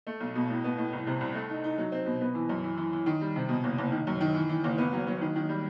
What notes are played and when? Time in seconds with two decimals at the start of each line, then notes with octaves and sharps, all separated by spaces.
0.07 A3
0.20 B1
0.35 B2
0.50 A2
0.64 B3
0.78 A2
0.93 C2
1.07 C3
1.21 C2
1.34 A3
1.49 D#4
1.64 D#4
1.78 F#3
1.92 C4
2.06 B2
2.21 B3
2.35 E3
2.49 F#2
2.64 E3
2.77 E3
2.93 E3
3.06 D#3
3.21 G3
3.36 C3
3.49 B2
3.64 F#1
3.78 F#1
3.92 D#3
4.07 F#2
4.21 D#3
4.34 E3
4.49 E3
4.64 F#1
4.78 B3
4.93 F#3
5.07 F#3
5.21 D#3
5.36 D#3
5.49 G3